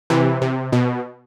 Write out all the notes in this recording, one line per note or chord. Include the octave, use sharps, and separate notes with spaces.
C3 E3
C3
B2